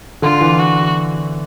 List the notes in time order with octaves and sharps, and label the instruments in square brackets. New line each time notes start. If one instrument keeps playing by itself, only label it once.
[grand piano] D3 [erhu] F4
[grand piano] E3
[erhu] F#4